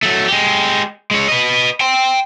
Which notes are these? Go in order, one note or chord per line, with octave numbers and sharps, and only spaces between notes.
F#3 A3
G#3 G4
G#3 C#5
B4 D#5
G5 C6